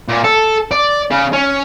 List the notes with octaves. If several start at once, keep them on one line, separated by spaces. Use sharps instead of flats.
A#2
A4
D5
C#3
C#4